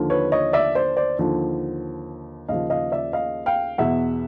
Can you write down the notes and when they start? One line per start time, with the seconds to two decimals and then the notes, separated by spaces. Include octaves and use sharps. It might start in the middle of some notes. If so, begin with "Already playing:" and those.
Already playing: D#2 D3 F3
0.10 B4 C#5
0.32 C#5 D#5
0.53 D5 E5
0.75 C5 D5
0.97 C5 D5
1.19 D#2 D3 F3
2.48 D#2 C#3 F3 D#5 F5
2.70 D#5 F5
2.92 D5 E5
3.13 D#5 F5
3.46 F5 G5
3.78 E2 B2 E5 F#5